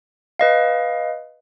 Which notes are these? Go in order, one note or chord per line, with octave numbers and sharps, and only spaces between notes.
B4 D#5 F5